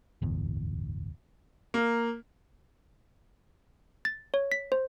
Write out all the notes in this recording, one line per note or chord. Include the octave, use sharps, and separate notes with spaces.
D1 G1 E2
A#3
A6
C#5
B6
C5